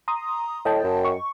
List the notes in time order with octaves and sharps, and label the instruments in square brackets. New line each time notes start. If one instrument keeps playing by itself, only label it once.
[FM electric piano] A#5 C6 D#6
[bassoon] A2 [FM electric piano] D#5 G5 A5
[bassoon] F#2
[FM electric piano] C#6